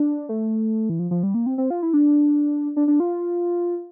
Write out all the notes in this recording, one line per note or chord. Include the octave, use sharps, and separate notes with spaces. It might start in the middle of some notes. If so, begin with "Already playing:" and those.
Already playing: D4
A3
E3
F3
F3
G3
A#3
C4
C4
F4
E4
D4
D4
D4
F4